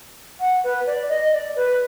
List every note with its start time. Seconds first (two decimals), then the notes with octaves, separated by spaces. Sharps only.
0.40 F#5
0.64 B4
0.86 D5
1.09 D#5
1.32 D5
1.56 B4